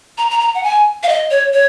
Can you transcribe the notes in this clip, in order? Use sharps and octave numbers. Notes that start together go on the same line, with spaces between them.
A#5
A#5
A#5
F#5
G#5
F5
D#5
C#5
C#5